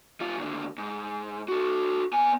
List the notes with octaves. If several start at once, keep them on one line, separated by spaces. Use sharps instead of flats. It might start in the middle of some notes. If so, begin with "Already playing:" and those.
G3 F4
D#2 D3
G#2
F#4 A4
B3 G#5